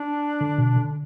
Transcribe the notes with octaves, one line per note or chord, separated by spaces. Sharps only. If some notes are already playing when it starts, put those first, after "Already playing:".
Already playing: D4
D3
B2
D3